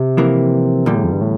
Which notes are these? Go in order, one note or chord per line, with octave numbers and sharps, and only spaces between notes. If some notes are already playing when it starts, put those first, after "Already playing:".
Already playing: C3
F2 E3 A#3
E2 A#2 D3 G3
A2
F2
G2
A2